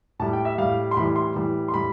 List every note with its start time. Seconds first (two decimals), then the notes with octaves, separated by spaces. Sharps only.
0.19 A2 G3 A5
0.33 G5
0.45 E5
0.58 A2 G3 F5
0.91 C6
0.97 A2 B5
0.99 E3 G3
1.16 C6
1.35 A2 E3 G3
1.68 C6
1.73 A2 G3 B5